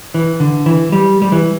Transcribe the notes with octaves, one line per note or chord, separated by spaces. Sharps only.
E3
D3
E3
G3
G3
E3